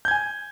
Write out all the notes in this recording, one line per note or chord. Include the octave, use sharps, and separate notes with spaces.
G#5 G6 G#6